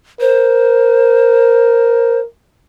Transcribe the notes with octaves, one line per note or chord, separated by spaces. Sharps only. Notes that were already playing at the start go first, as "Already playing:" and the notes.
A#4 C5